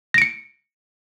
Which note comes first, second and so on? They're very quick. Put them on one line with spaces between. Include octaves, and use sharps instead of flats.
A#6 D7 C#7